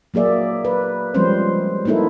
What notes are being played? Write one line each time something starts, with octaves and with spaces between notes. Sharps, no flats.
F#3 A#3 G#4 D5 E5
B4
F3 G3 G#3 C4 C#4 C5
A#3 B3 D#4 E4 A4